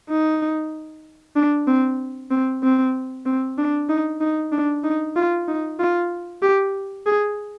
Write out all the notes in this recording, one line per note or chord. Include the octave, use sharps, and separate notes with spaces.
D#4
D4
C4
C4
C4
C4
D4
D#4
D#4
D4
D#4
F4
D#4
F4
G4
G#4